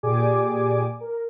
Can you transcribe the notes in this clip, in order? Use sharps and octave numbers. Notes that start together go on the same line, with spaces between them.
A#2 G4 G#4 D5 G#5 D6
A#4